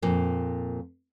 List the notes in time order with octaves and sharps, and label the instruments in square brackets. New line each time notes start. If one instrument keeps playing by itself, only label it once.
[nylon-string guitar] F2 A#2 A#3